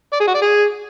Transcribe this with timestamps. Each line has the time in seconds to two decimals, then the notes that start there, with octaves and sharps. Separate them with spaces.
0.13 D5
0.20 G#4
0.27 F#4
0.34 D5
0.42 G#4